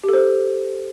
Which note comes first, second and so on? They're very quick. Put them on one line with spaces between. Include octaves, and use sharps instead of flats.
G4 A4 C5